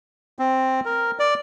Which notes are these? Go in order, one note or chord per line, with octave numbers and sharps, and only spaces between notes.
C4
A#4
D5